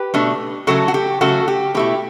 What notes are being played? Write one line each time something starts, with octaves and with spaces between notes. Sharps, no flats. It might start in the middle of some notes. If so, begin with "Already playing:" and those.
Already playing: G4 B4
B2 A3 D4
C#3 F#3 A3 F#4 A4
F#4
G4
C#3 F#3 A3 F#4 A4
G4
B2 A3 E4 G4